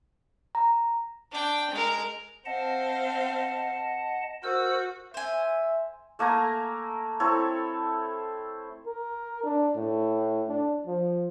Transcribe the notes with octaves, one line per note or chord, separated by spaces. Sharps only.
A#5
D4 G5
G#3 A#4
C4 D#5 F5 F#5 A5
F#4 A#4 C5 E6
C5 E5 G#5
A3 A#3 G#5 A#5
C4 E4 A4 C#5
A#4
D4
A2
D4
F3